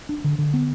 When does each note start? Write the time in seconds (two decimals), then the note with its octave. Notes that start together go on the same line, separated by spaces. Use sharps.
0.09 D4
0.24 D3
0.38 D3
0.53 B3